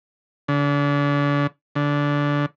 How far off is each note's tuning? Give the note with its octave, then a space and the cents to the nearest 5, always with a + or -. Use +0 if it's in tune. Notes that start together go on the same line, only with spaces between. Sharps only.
D3 -40
D3 -20